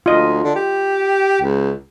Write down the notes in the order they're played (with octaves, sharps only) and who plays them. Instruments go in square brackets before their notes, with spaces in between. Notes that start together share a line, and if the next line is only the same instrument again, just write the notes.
[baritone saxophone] D2 [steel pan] F4 D#5
[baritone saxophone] D3
G4
C#2